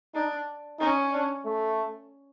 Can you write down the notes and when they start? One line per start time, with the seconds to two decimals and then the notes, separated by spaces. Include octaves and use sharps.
0.14 D4 D#4
0.79 C#4 D#4
1.13 D4
1.45 A3